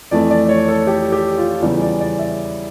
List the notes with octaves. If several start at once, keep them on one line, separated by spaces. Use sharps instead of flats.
F2 E3 A3 D5
D5
C#5
A4
G4
G4
F4
E2 C#3 E3 G3 D5
D5
D5
E5